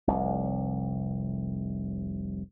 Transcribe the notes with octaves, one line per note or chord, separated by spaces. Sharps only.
F1 C2